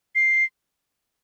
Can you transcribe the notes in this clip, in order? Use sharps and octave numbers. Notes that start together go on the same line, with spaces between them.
C7